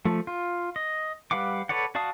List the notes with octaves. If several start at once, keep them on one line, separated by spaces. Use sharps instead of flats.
F3 A3
F4
D#5
G3 B4 F5 F#5 D6
A4 B4 C#5 D5 F#5
F#4 D5 F5 A5 D#6